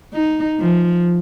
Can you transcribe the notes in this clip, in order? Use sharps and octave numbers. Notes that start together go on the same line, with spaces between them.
D#4
F3